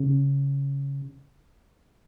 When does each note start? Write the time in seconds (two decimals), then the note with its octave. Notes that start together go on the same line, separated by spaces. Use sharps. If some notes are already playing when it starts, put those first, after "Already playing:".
Already playing: C#3